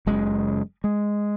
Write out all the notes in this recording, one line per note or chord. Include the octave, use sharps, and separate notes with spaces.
F#1 F#2 C#3 G#3
G#3